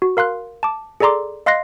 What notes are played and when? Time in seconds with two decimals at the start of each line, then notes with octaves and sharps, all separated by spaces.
0.02 F#4
0.17 A#4 F5 C6 F#6
0.63 A5 D6
1.00 G#4 A4 D5 A#5 C6 D6
1.46 D#5 F5 C6 F#6 A#6 C7